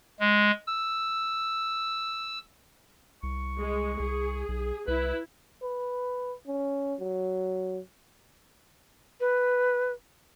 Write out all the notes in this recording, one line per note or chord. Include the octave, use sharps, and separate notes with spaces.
G#3
E6
C2 C#6
G#3
C2 G#4
B1
C2 E4 B4
B4
C#4
F#3
B4